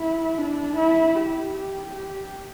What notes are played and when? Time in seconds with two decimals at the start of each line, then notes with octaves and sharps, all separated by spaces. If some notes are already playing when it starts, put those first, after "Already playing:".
Already playing: E4
0.38 D4
0.77 E4
1.16 G4
1.55 G4
1.94 G4